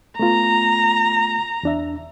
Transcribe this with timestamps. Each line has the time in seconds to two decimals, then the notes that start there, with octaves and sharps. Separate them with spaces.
0.19 A3 B3 F4 A#5
1.63 E2 D4 E5